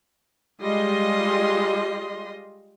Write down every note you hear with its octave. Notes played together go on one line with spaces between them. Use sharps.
G3 G#3 F4 D#5 C6